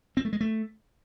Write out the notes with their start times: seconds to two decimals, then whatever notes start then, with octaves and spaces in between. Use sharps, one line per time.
0.17 C4
0.25 A3
0.33 G#3
0.41 A3